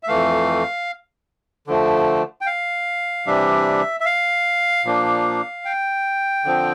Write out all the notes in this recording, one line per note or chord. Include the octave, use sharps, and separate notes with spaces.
E5
F2 E3 A3 F5
D3 F3 A3
G5
F5
C3 E3 G3 D4 E5
E5
F5
A#2 F3 A#3 D4
G5
D3 F3 C4